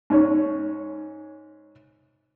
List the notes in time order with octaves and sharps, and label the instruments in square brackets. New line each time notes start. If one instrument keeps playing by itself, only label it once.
[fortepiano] G#2 C#4 C#5